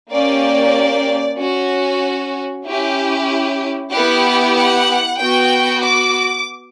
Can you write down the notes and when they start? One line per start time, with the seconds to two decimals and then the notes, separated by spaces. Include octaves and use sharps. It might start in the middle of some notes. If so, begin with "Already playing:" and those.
0.10 A#3 C#4 G4 D5
1.37 C#4 F#4
2.65 C#4 E4 G4
3.91 B3 E4 G4 F#5
4.56 F#5
5.19 B3 F#4 G5
5.82 D6